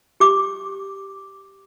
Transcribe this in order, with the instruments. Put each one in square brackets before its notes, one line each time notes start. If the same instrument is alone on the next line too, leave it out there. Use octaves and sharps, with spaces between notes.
[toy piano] G4 D6